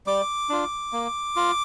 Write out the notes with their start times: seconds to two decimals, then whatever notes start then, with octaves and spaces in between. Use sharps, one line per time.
0.07 G3 D6
0.49 D4 F4
0.92 A#3
1.36 F4